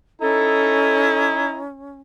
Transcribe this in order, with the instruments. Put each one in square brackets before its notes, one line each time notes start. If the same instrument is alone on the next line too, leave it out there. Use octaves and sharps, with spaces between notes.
[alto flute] C#4 [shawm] E4 [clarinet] A4 [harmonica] D#5 A#5